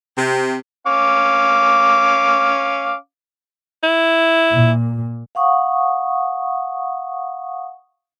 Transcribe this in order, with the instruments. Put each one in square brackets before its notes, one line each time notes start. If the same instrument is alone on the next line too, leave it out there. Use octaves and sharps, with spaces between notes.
[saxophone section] C3
[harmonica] C#4 F5 D6
[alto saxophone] E4
[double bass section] A#2
[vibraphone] F5 F#5 C#6 D#6